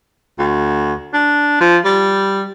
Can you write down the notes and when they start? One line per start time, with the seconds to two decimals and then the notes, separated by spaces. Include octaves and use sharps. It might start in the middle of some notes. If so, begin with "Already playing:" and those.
0.39 D2
1.14 D4
1.61 F3
1.85 G3